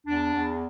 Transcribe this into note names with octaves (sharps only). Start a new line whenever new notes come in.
E2 D4
E2